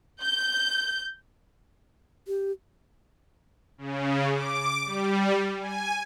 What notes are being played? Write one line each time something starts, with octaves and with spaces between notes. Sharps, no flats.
G6
G4
C#3
D6
G3
G#5